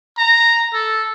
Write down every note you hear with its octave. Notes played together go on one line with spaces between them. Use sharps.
A#5
A4